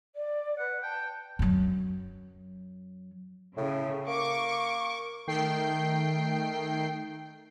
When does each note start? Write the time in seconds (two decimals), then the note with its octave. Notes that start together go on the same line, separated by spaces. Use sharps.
0.15 D5
0.58 B4 F#5
0.83 G5 A5
1.39 F#2 F#3
3.57 A2 C#3
4.08 A#3 C#6 D6
5.27 D#3 A3 G5 C7